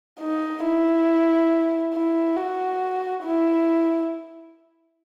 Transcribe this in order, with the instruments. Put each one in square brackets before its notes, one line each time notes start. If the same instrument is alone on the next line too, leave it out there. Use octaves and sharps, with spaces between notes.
[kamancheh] D#4
E4
E4
F#4
E4